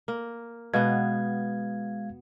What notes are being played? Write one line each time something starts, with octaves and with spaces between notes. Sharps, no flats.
A#3
B2 G#3 B3 F5 G#6